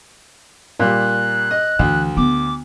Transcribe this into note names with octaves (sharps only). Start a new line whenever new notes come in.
A#2 G3 F#6
D#5
D2 E3
D3 B3 D6